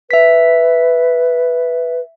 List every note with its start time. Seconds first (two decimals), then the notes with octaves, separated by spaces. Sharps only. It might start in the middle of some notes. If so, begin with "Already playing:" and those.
0.11 B4 E5 B6